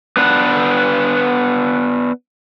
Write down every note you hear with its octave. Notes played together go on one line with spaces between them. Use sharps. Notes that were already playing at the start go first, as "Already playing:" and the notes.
B3 D4 B4